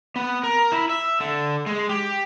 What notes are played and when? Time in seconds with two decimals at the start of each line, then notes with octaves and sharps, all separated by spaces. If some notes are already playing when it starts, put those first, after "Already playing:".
0.16 B3
0.44 A#4
0.72 E4
0.89 E5
1.20 D3
1.66 G#3
1.89 G4